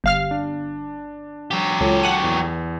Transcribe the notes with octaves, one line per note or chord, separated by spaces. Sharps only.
G1 F5 F6
D4
F#3 G4
C#2 A4 C#5 A5
F#5 D#7
E2